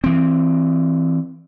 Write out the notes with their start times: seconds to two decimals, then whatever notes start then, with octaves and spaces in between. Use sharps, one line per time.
0.04 E3 C4